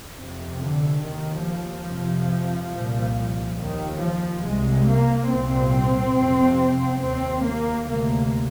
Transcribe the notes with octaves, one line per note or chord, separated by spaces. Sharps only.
F2 C3
D3
D#2 D#3
F3
F2 C3
C2 A#2
D#2 D#3
F3
C2 C3 G#3
A#3
C2 A#2 C4
F2 C3
D#2 C4
A#3
D2 C3 A#3